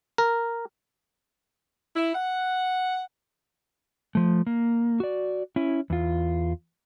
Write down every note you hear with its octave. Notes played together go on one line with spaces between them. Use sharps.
A#4
E4
F#5
F3 A3
A#3
F#4 D5
C#4 E4
E2 F4